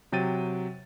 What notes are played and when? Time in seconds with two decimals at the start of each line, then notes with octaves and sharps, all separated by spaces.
0.12 C3 F#3 G5 A6 D#7